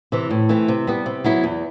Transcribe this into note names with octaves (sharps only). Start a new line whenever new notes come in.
C3 E3
A2
E3 A3 C4
C3
G3 B3
C3
F#3 B3 E4
E2